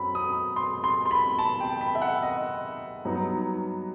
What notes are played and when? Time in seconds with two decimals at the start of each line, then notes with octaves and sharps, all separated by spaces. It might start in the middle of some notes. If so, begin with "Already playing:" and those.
Already playing: F#2 F#3 C4 B5
0.15 D#6
0.56 C6
0.84 C6
1.06 C6
1.11 B5
1.39 A5
1.60 G5
1.81 B5
1.95 E5
2.02 F#5
2.22 D#5
3.05 G2 F#3 B3 D#4